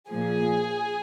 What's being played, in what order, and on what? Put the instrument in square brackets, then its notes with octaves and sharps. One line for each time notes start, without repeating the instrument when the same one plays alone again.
[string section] A#2 F3 G#4